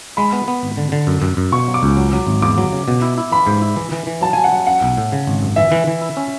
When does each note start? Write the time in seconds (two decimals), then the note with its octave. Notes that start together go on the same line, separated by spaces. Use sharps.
0.17 G#3 B5
0.33 B3
0.48 B3
0.63 G#1
0.77 D3
0.92 D3
1.07 F#2
1.22 F#2
1.37 F#2
1.52 B2 C#6
1.68 F#3
1.74 D6
1.83 C#2
1.97 F#3
2.13 F#3
2.27 G#1
2.42 E2 D6
2.58 F#3
2.72 C#3
2.88 B2
3.02 E4
3.18 E4
3.32 E3 B5
3.47 G#2
3.62 E4
3.76 E3
3.92 E3
4.07 E3
4.21 F#3 A5
4.33 F#3 G#5
4.44 F#5
4.52 F#3
4.67 C#4 F#5
4.82 B1
4.97 A2
5.12 C#3
5.27 G#1
5.42 F#2
5.56 E3 E5
5.72 E3
5.87 E3
6.02 E4
6.17 C#4